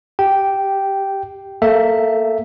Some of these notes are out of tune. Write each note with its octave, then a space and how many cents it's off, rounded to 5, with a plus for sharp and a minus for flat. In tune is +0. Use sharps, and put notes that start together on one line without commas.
G4 +0 G5 -5
A#3 -15 A4 +0 E5 +0